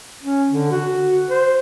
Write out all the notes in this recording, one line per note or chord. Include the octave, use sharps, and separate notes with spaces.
C#4
D3
F#4
C5